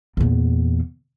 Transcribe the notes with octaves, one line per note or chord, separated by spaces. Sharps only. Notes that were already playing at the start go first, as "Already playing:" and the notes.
E2 A#2